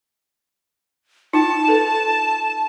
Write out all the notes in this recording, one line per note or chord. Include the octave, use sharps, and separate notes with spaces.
D#4 F4 G5 A5
A4 B4